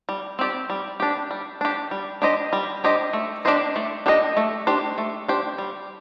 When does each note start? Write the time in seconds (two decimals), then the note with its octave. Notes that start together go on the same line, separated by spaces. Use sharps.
0.09 G3
0.39 C4 G4 D5
0.70 G3
1.00 D4 G4
1.31 G3
1.61 D4 G4
1.91 G3
2.22 D4 G4 C5 D#5
2.53 G3
2.84 D4 G4 C5 D#5
3.13 A3
3.45 D4 G4 C5 D#5
3.76 A3
4.06 D4 G4 C5 D#5
4.37 A3
4.67 D4 G4 C5
4.98 A3
5.28 D4 G4 C5
5.58 G3